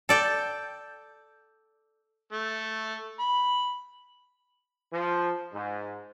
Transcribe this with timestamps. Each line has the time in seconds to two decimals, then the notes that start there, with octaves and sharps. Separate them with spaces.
0.09 A4 D5 G5
2.32 A3
3.19 B5
4.93 F3
5.54 G#2